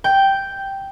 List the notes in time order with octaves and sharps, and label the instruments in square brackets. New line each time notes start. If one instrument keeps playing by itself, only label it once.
[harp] G5